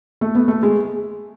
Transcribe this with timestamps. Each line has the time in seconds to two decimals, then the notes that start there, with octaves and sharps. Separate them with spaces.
0.21 A3
0.35 B3
0.48 A3
0.63 G#3